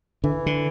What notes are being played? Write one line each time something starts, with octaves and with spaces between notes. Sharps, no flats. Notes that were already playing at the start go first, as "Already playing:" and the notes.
D3 E3
D3